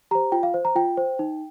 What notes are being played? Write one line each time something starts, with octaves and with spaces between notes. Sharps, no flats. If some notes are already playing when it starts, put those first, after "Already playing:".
G4 C5 A#5
F4 G5
F5
C5
A#5
F4 G5
C5
D#4